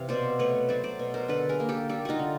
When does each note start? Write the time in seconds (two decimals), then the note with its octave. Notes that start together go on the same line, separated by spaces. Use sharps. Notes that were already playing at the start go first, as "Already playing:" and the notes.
Already playing: C3 E3 F5
0.09 B2 C5 D5
0.39 A3 B4 C#5
0.69 F#3 C5 D5
0.84 C5 D5
0.99 B2
1.14 A#4 C5
1.28 D3 A4 B4
1.49 G#4 A#4
1.60 A#3
1.69 G4 A4
1.89 G3 G4 A4
2.05 D#4 F4 F#4
2.19 D3